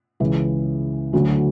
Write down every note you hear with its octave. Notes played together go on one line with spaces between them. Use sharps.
C#2 C#3 E3
D2 D3 F#3